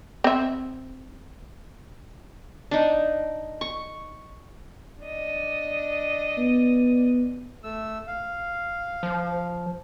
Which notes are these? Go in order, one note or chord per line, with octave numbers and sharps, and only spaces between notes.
C4 E5
D4 D#4
C#6
D4 D5 D#5
B3
A3 E6
F5
F3